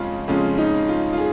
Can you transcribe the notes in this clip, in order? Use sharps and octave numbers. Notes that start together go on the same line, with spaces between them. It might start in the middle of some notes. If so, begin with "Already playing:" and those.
Already playing: F2 C#3 G#3 C#4 F4 G#4
F2 C#3 G#3 C#4 F4
D#4
F4
F4
G#4